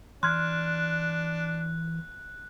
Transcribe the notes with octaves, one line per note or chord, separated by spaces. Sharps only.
E3 D4 C6 F6 F#6 G#6